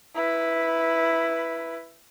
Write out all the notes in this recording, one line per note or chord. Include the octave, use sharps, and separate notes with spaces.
E4 B4